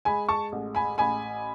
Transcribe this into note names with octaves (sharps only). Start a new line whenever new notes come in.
G#3 G#5 B5
A5 C#6
A1
G#5 B5
A1 G#5 B5